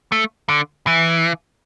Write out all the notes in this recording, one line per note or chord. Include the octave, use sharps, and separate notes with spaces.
A3
D3
E3